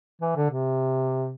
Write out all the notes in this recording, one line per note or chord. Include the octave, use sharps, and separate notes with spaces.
E3
D3
C3